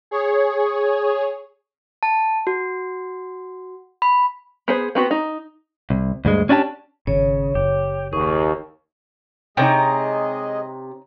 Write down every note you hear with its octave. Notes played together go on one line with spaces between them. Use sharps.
G#4 C#5
A5
F#4
B5
B3 G#4 C5
B3 C4 F#4 B4
D#4
C2
D2 G2 G#3
C#4 D4 E4 G4 A5
G#1 C#3 C#5
F#1 G4
D#2 G#4 C#6
C3 G#3 D#4 G#4 C#5 D#5 G5 A#5